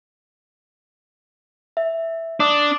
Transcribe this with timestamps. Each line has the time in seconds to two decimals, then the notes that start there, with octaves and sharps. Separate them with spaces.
1.77 E5
2.40 D4 D6 D#6